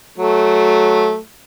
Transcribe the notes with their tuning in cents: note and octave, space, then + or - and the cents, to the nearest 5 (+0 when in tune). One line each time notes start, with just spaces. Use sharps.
F#3 +0 A3 -15